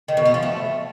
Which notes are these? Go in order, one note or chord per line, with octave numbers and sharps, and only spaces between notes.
D#3
B2
B3
F3
A3